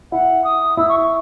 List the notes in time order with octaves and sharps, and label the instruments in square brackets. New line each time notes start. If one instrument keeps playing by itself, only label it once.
[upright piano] E4 [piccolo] F#5
[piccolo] D#6
[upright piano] E4 [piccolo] E6
[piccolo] C#6
C#6